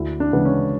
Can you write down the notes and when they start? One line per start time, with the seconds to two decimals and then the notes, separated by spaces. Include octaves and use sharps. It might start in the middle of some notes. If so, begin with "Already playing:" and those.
Already playing: D2 E4
0.20 D4
0.33 C#3 E3 G#3 B3
0.45 C#4